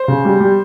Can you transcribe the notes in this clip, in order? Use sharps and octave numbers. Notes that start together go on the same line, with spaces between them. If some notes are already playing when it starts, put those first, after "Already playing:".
Already playing: C5
C#3
G3
G3